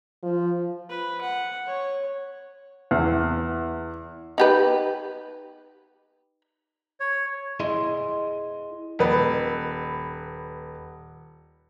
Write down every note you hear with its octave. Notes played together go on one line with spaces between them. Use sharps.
F3
B4
F#5
C#5
E2
D#4 G4 B4
C#5
E4 G#4 D#5 C6
D#1 B4